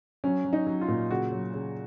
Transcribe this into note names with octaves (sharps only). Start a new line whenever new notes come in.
F#3 C#4
F#3
D#4
F#3
F4
A#2
C#3 F#4
F#3
C#3